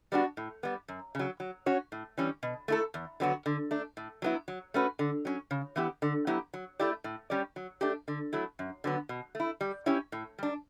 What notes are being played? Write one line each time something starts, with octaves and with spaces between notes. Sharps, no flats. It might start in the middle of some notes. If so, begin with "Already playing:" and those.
G3 B3 D4 F#4
A2
G3 B3
F#2
C#3 F#3
F#3
C#4 F#4 C#5
A2
E3 G3 C#4
B2
A3 E4 A4
E2
D3 F#3 B3 F#4
D3
A3 D4
A2
F#3 B3 E4
F#3
A3 C#4 F#4 B4
D3
F#3 C#4
C#3
E3 B3 E4 G4
D3
F#3 B3 E4 G4
F#3
A3 E4 G4 D5
A2
G3 C#4 G4 D5
F#3
A3 D4 G4
D3
F#3 A3 E4
F#2
D3 F#3 B3
B2
A3 E4
G3
C#4 E4 G4 C#5
A2
G3 D4